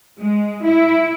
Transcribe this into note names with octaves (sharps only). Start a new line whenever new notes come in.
G#3
E4